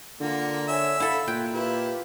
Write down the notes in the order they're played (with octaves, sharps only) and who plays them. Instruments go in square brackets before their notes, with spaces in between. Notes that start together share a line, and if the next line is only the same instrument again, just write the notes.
[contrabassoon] D3 [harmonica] A#3 [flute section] F4 F#5
[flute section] C#5 G#5 [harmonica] E5
[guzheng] E4 A4 [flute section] F5 F#5 B5
[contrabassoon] A#2 [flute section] F4 F#6 G#6 [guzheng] G5
[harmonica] E4 [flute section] F4 G4 B4